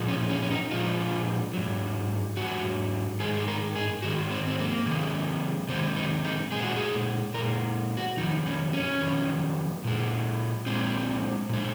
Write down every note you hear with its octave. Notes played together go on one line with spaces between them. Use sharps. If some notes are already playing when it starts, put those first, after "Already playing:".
Already playing: A#2 F3 G#3
C#4
C#4
C#4
D#4
A#2 F3 G#3 F4
G#2 F#3
G#2 F#3 F#4
G#2 D#3 G#3 G#4
G#4
A#4
G#4
G#2 D#3 G#3 F#4
C4
C4
A#3
C3 D#3 G#3
C3 D#3 G#3 C4
D#4
D#4
A#2 G#3 G#4
F#4
G#4
A#2 G#3 A#4
F#4
F2 D#3 F#3 D#4
C#4
C#4
F2 D#3 F#3
A#2 G#3
A#2 G#3 C4
A#2 G#3